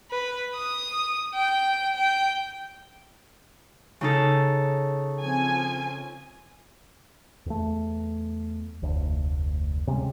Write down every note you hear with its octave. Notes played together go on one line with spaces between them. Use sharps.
B4
D#6
G5
G5
C#3 D#4 A4
F3 C4 G#5
E2 A3
F1 D2
C3 G3 G#3 C#4